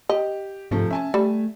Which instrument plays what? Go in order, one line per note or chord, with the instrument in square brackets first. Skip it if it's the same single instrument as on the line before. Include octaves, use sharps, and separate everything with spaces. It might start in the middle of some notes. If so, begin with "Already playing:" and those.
[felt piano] G4 [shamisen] D#5
[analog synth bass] G#2 [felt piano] C3 F3 A3
[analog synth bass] C#4 [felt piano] E5 G#5 A5
[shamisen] G3 [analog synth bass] A3